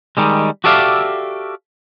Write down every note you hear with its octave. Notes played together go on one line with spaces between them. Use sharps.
D#3 G3 G#3
F#4 G4 A4 D5 E5 F5